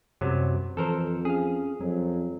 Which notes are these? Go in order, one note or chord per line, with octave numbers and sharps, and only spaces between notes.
C2 F#2 C3 F#3
F2 E3 A4 A#4 C5
C#4 G#4 F5
F2 F#3